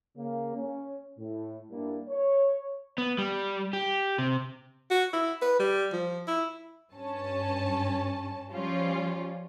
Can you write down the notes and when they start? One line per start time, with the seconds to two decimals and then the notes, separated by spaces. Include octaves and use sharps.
0.16 C#3 A#3
0.55 C#4
1.18 A2
1.71 G2 G3 A#3 D4 E4
2.08 C#5
2.98 B3
3.18 G3
3.73 G4
4.18 C3
4.90 F#4
5.13 E4
5.41 B4
5.59 G3
5.92 F3
6.27 E4
6.94 G2 C#4 A5
8.51 F3 G3 C#4 F4